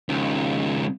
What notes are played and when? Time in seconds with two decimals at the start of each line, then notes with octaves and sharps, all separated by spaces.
0.09 C#2 D#3